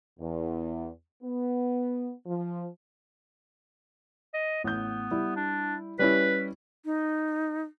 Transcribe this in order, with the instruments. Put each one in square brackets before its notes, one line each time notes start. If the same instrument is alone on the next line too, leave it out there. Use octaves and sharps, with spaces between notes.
[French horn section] E2
B3
F3
[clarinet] D#5
[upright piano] A1 G6 [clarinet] B3
[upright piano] G3 E4
[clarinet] D4
[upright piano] G3 C#4 E4 [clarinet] B4
[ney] D#4